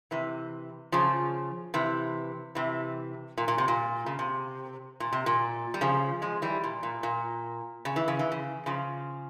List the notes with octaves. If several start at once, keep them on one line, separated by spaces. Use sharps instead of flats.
C3 E3
C#3 F3
C3 E3
C3 E3
A#2
A#2
C3
A#2
C#3
C3
A#2
C3
A#2
G3
C#3 F3
F3 G#3
E3 G3
A#2
A#2
A#2
C#3
E3
C#3
E3
C#3
C#3 F3